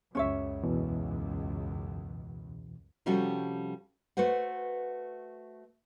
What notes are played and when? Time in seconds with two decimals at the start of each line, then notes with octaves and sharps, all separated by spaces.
0.15 C#2 F#2 C#4 C#5 E5
0.63 E2 B2 E3
3.06 C3 F3 G3 C#4 F#4 A4
4.17 A3 F#4 B4 C5 F#5